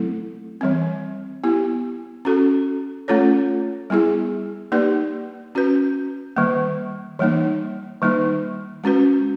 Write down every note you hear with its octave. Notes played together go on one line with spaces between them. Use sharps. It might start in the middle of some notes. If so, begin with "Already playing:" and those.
Already playing: F#3 A3 C4 E4 A4
E3 G3 C4
B3 E4 G4
C#4 F#4 A4
A3 C#4 F4 A4 C#5
G3 B3 E4 G#4
A#3 D#4 G4 B4 D5
C#4 F#4 B4
D#3 G3 A#3
E3 G3 A#3 D#4
D#3 G3 A#3 D#4
G#3 C#4 F#4 B4